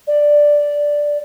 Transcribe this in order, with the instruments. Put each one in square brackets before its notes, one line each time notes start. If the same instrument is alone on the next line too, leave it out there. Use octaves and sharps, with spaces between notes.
[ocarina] D5